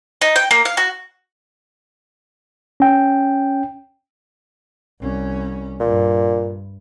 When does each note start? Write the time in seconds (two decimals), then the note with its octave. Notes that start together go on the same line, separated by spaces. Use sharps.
0.21 D#4
0.36 G5
0.51 A#3
0.65 F5
0.77 F#4
2.80 C#4 G5
5.00 C2 C#4
5.80 G2 A#2